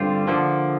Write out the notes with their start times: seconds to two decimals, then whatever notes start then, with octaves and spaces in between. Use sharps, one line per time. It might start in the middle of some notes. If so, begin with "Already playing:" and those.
Already playing: G2 D3 G3 C4 F4
0.28 D3 F3 A#3